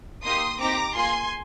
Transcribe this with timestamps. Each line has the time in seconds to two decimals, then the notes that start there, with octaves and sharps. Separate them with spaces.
0.24 A#3 D#4 G4 C6 D#6
0.59 C4 D#4 G4 A#5 D6
0.94 A#3 F4 G#4 G#5 C6